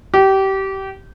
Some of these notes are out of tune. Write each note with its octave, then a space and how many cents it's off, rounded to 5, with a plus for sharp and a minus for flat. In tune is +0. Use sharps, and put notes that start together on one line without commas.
G4 -25